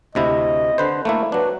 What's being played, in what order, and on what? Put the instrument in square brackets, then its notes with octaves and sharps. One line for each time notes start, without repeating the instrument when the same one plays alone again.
[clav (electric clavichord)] D2 C3 E4 [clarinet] D#5
[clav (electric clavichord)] D3 B4 C5
A3 A#3 E4
[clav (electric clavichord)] F#3 D4 [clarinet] B4